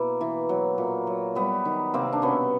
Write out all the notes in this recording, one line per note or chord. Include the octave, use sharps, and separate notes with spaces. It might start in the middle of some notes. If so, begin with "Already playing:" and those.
Already playing: B2 A#3 E4
E3
F#3
A#2
F#3
G3 B3
D#3
C3 A#3 C4
D4
B2 B3 C#4